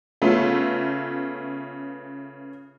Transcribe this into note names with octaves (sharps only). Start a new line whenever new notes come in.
C#3 A3 B3 F4